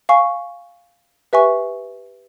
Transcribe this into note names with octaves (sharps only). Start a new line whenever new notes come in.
F5 G#5 C#6
G4 B4 E5 G#5 C#6